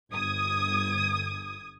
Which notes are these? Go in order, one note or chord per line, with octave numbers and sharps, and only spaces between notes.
G1 D#6 G#6